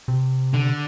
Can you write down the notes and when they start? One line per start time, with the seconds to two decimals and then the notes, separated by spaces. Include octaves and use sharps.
0.08 C3
0.54 D3